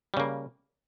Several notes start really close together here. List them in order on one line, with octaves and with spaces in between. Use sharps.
G3 C#3 A#3